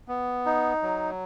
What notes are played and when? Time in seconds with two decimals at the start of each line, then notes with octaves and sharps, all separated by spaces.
0.08 B3
0.46 D#4
0.82 F#3